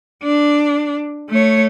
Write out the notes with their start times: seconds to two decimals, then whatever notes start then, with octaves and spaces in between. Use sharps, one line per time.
0.23 D4
1.30 A3 C#5